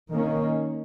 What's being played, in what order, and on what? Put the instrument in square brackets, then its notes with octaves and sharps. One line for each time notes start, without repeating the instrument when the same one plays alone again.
[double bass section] D#3 A#3 C#4